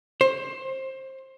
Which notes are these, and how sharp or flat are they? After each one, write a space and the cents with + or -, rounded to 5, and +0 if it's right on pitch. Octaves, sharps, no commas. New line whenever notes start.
C5 +20